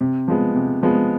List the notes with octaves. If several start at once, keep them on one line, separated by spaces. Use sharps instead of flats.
C3
F3 G#3 B3
C3
F3 G#3 B3